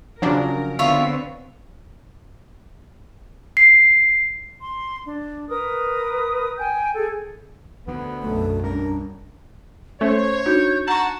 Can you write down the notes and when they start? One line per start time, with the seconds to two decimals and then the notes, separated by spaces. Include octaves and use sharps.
0.22 C#3 F3 F#3 C#4 D4 A#4
0.79 D3 B3 C4 F4 C#5 E5
3.57 C7
4.60 C6
5.07 D4
5.48 A#4 B4 D#6
6.57 G5 G#5 G6
6.94 G#4 A4
7.87 D2 D3 B3
8.22 B1 F#2 A3
8.64 G3 C#4 D4 A#4
10.01 A3 C#4 C5 C#5
10.46 D4 D#4 F#4 G6
10.88 F#4 F#5 A5 A#5 C#6